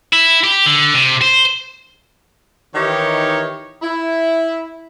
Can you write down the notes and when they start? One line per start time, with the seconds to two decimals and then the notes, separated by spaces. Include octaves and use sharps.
0.13 E4
0.43 G4
0.66 D3
0.94 C3
1.22 C5
2.74 D#3 E3 D#4 G4 C#5
3.82 E4